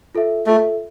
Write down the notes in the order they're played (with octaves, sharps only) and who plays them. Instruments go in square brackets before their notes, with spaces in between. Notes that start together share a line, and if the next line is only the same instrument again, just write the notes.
[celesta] F4 A4 E5
[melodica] A3 [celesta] F4 A4 E5